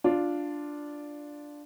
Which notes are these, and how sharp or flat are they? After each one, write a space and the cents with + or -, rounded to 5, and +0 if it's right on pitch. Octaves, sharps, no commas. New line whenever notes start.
D4 +0 F4 +0